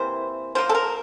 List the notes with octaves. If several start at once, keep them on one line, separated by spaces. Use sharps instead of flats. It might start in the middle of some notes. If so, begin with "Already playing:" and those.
Already playing: C3 E3 A#3 E4 C5
F3 A#3 F4 C5
A4
A#4